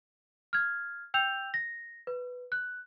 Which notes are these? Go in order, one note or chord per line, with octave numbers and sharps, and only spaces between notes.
F6 G#6
G5 E6 G6 F7
A#6
B4
F#6